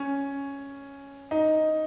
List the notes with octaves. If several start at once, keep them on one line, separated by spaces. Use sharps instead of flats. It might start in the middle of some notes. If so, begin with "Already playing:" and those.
Already playing: C#4
D#4